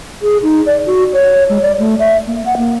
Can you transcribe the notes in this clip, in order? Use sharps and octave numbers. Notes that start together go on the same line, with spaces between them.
G#4
D#4
D5
F#4
C#5
G#3
D5
A3
E5
A#3
F#5
A#3